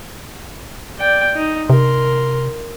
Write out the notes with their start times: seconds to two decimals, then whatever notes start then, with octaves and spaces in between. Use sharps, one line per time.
0.99 D5 G5
1.35 D#4
1.70 C3 A#4 C6